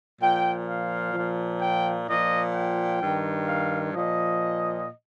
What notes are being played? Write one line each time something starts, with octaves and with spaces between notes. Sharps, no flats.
A#2 F3 G5
F5
A#2 F3
G5
A#2 F3 D#5
G5
G2 D#3
F5
A#2 F3 D#5